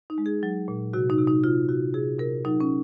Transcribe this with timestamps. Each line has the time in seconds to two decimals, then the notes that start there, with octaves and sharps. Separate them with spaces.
0.10 D#4
0.18 G#3
0.26 G#4
0.43 F#3
0.68 A#2
0.93 C3 F#4
1.10 D#4
1.18 C3
1.27 D#4
1.43 C3 F4
1.69 C3 F#4
1.94 C3 G#4
2.19 C3 A#4
2.45 F#3 D#4
2.61 C#4